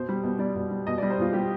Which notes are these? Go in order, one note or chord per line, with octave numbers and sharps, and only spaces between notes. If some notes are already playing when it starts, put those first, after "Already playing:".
Already playing: B2 C5
G3
B2
G3 D5
B2
G3
B2 D#5
D5
G3
C5
B2 F4
G3 G4